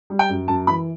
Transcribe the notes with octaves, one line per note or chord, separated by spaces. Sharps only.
G3
G5
F#2
F#2 A5
E3 B5